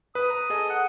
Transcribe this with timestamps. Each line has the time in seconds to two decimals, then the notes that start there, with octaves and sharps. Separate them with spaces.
0.15 B4 D#6
0.30 A#5
0.50 G#4 A4 D#5
0.70 F#5